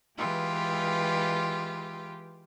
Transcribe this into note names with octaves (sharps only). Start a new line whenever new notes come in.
E3 G#3 F4 G4 B4